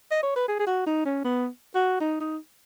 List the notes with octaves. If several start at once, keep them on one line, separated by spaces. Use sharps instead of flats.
D#5
C#5
B4
G#4
G#4
F#4
D#4
C#4
B3
F#4
D#4
D#4